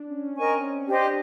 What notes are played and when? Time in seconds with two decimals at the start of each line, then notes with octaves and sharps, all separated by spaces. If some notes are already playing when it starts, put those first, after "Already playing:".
Already playing: D4
0.09 C#4
0.26 C#4
0.36 C4 A#4 D#5 G#5 C#6
0.61 C#4
0.84 C#4
0.88 D4 G4 C5 D#5